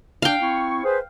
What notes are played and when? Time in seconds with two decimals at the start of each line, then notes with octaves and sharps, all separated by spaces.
0.22 D4 F5 G5
0.41 C4 E4 C#6
0.84 G#4 B4 C5